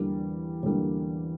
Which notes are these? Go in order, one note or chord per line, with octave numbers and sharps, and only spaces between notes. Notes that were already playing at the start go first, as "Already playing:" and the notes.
Already playing: E2 D3 G3 A#3
E2 D3 G3 A#3